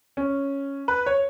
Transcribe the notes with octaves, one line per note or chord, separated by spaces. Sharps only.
C#4
B4
C#5